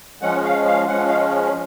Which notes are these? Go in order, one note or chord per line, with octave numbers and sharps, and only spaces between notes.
F3 G#3 C#4 F#5
F5
F5
F3 G#3 C#4 F#5
F5